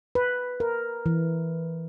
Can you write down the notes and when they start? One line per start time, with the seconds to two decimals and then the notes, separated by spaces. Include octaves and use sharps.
0.15 B4
0.60 A#4
1.06 E3